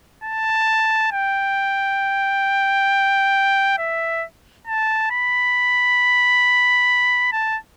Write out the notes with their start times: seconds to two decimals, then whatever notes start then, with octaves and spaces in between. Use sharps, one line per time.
0.23 A5
1.12 G5
3.78 E5
4.67 A5
5.11 B5
7.32 A5